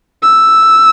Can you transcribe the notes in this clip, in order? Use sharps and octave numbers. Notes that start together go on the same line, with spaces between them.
E6